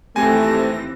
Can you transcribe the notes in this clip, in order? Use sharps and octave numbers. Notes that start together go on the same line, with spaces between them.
D#2 E3 A3 C4 G4 G#5 A#6